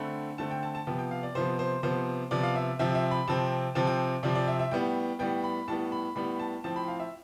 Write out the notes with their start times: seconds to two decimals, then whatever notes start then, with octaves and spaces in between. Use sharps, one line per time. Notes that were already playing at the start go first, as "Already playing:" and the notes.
Already playing: D3 A3 C4 B5
0.38 D3 A3 C4 A5
0.51 G5
0.63 A5
0.75 A5
0.87 C3 F3 B3 G5
0.99 G5
1.11 F5
1.23 D5
1.35 C3 F3 B3 C5
1.59 C5
1.83 C3 F3 B3 C5
2.31 C3 F3 B3 D5
2.43 F5
2.55 E5
2.79 C3 F3 C4 E5
2.95 E5
3.11 B5
3.28 C3 F3 C4 A5
3.75 C3 F3 C4 A5
3.87 G5
4.23 C3 F3 C4 D5
4.35 D5
4.48 E5
4.59 E5
4.71 A2 G3 B3 G5
5.19 A2 G3 B3 G5
5.44 B5
5.68 A2 G3 B3 A5
5.92 B5
6.15 A2 G3 B3 B5
6.40 A5
6.64 A2 F3 C4 A5
6.76 B5
6.88 F5
7.00 E5